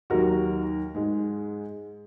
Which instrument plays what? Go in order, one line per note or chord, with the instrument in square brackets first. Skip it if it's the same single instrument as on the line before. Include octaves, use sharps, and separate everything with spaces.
[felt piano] D#2 D#3 F#3 F#4 A#4
G#2 G#3